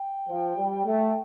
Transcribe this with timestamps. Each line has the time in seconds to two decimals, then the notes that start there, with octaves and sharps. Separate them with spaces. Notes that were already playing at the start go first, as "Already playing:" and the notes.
Already playing: G5
0.29 F3
0.56 G3
0.85 A3